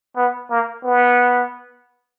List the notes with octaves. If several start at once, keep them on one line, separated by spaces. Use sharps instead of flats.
B3
A#3
B3